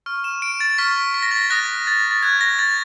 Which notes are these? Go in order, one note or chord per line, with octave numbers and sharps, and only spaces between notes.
C#6 F6
E7
D7
A6
C#6 F6 B6
B6
A#6
A6
A#6
D#6 F#6 A#6
A6
A6
D#6 F#6 G#6
A#6
A6